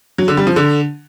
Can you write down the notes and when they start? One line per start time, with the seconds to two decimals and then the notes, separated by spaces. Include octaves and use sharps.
0.18 F#3
0.28 D3
0.37 G3
0.47 F3
0.56 D3